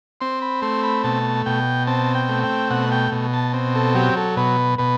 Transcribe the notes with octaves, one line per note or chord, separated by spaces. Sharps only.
C4 C6
B5
A3 C6
B5
B2 A5
B2 G5
C4 A5
G5
A3
G5
B2 F#5
G5
B2
A5
C4
A4
F#3 G4
A4
B2 B4
B2 B4